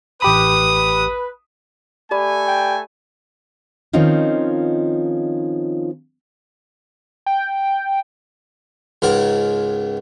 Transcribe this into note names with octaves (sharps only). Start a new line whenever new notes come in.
A1 G4 B4 B5 D#6
A3 G4 A4 D5 G#5 B5
G5
D#3 F3 C4 C#4 D#4 F4
G5
C#2 G#2 A#4